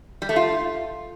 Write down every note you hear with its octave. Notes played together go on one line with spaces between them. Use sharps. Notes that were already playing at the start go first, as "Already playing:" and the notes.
G3
A3
F4